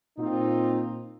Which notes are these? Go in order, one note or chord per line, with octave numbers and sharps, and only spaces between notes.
A#2 C4 D#4 F4